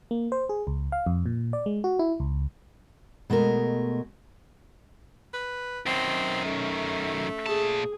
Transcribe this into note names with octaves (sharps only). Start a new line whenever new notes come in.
A#3
C5
G#4
C#2
F5
F2
A#2
D5
G#3
F#4
E4
C#2
B2 G#3 A3 A#4
B4
F#2 D#3 C4
A3 C#4
A#2 G#4 A5